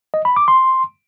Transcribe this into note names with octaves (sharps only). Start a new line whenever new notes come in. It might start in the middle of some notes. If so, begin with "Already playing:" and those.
D#5
B5
D6
C6